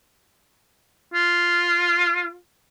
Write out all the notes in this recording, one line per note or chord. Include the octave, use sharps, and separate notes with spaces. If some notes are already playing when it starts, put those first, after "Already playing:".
F4